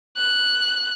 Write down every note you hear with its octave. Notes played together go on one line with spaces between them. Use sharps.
F#6